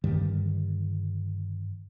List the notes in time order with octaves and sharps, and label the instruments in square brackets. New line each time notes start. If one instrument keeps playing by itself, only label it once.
[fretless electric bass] G2 D3 D#3 G3